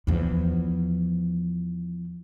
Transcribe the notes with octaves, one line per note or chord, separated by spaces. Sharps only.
E2 F3